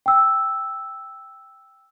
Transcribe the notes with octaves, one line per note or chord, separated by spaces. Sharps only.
G5 E6